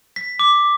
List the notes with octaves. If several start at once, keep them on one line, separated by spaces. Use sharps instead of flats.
B6
D6